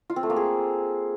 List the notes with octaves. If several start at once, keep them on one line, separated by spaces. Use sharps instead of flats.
F4
C4
A3
A#3
G#4